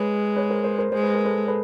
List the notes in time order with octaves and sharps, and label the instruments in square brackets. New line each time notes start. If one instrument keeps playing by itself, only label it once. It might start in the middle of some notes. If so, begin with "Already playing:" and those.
Already playing: [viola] G#3 [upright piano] B4 C#5
[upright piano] B4 C#5
A#4 C5
A#4 C5
A#4 C5
[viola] G#3 [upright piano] C5
[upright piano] B4
A#4
A4 B4
A4 B4